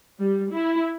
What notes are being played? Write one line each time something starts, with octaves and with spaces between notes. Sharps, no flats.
G3
E4